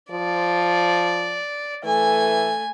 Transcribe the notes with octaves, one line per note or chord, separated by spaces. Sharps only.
F3 D5
E3 A3 G#5